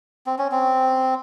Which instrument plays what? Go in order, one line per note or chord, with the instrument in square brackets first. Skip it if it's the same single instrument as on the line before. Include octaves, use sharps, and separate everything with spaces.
[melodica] C4
C#4
C4